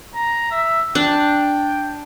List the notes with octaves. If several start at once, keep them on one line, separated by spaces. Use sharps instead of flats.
A#5
E5
D4 G5